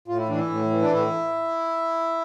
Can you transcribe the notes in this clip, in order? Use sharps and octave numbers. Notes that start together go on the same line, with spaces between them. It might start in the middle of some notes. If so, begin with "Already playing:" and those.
A2 F4
E4
E3 D4
E4
A2
E3
D4
A2 E4